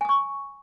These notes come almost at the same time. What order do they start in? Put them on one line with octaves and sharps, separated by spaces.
G#5 D#6 C#6